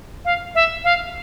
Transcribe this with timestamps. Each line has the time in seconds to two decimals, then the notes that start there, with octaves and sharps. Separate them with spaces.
0.25 F5
0.55 E5
0.84 F5